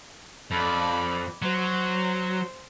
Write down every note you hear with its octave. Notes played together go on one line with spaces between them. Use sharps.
F2 D5 B5
F#3 C5